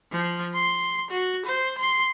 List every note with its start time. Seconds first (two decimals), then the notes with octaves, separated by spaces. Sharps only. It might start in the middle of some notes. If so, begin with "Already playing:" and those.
0.12 F3
0.54 C6
1.11 F#4
1.45 C5
1.78 C6